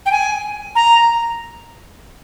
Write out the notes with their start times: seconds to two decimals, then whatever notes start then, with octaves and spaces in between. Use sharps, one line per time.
0.06 G5
0.11 G#5
0.75 A#5